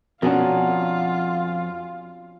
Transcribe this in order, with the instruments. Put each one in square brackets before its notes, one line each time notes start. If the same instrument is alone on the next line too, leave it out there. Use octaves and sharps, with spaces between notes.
[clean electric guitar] F2 G#4 F#5 [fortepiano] B2 [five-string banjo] C#4 D4 A#4 [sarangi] F4